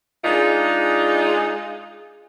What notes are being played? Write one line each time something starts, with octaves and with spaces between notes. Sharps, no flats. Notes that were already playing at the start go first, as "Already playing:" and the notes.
G#3 D4 D#4 F4 G#4